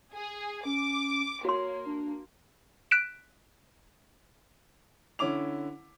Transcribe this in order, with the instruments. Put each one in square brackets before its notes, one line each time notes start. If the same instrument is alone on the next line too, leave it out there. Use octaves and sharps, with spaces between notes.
[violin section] G#4
[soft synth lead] C#4 [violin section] D6
[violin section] A#3 [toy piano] F#4 C6 [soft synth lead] C#5
[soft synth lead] D4
[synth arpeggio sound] F#6 B6 D7 E7
[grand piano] D3 C#4 E4 D6 F7